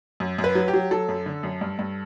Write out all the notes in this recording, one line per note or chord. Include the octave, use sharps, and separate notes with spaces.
F#2
F#2
B4
F#3
G4
F#3
F#3 A4
F#2
D3
F#2
G2
G2